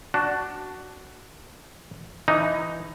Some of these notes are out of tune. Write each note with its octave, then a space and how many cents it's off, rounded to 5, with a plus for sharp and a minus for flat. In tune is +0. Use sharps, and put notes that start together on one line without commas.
D4 +0 F#4 +15
E3 +10 D#4 +0